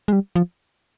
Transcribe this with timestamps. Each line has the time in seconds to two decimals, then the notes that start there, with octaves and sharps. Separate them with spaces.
0.08 G#3
0.13 G3
0.36 F3